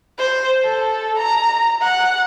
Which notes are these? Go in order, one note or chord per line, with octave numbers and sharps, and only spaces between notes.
C5
A4
A#5
F#5